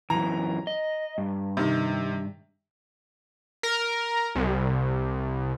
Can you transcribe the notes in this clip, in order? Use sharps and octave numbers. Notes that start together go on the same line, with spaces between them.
F#2 E3 A#5
D#5
G2
C3 D#3
A#4
C2